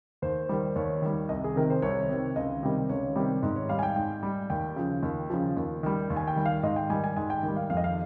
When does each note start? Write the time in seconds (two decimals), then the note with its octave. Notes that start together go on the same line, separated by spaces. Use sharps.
0.22 D#2 C5
0.49 D#3 G3
0.76 D#2 C#5
1.02 D#3 G3
1.29 C2 D#5
1.44 G#4
1.56 C3 D#3 A#4
1.70 C5
1.82 C2 C#5
2.09 C3 D#3
2.36 C#2 D#5
2.63 C3 D#3 G3
2.89 C#2 C#5
3.16 C3 D#3 G3
3.43 G#2
3.56 C#5
3.69 G3 F5
3.79 G#5
3.83 G5
3.96 G#2 G5
4.23 G3
4.50 D#2 G5
4.76 C#3 F3
5.03 D#2
5.30 C#3 F3
5.57 D#2
5.83 D#3 G3
6.10 D#2
6.16 G#5
6.28 G5
6.36 D#3 G3
6.46 F5
6.63 G#2 D#5
6.76 G5
6.90 D#3 G3 G#5
7.04 G#5
7.17 G#2 G#5
7.30 G5
7.43 D#3 G3
7.56 F5
7.70 F2 F5
7.77 D#5
7.84 F5